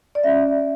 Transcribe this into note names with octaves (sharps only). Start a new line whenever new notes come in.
D5
C#4 E5